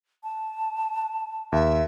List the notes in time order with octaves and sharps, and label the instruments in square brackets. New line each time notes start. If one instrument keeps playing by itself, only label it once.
[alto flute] A5
[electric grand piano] D#2 [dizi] E5